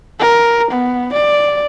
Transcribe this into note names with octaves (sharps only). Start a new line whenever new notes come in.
A#4
B3
D5